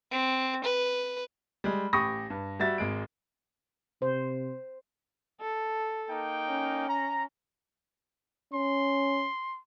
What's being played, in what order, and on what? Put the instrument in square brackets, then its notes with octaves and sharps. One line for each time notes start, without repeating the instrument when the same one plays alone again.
[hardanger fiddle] C4
B4
[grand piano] G3 G#3
A1 G4 B5 C#6 D#6 A#6
G2
G3 F#4 E5 A6
G#1 G#3 D7
[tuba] C3 [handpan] C5
[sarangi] A4
[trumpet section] A#3 D#4 G5
[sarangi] C#4
[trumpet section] A#5
[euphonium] C#4 [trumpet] C6